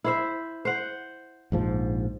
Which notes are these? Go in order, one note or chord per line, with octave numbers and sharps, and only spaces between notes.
E4 C5 E5
C5 F#5
A#1 G#2 F3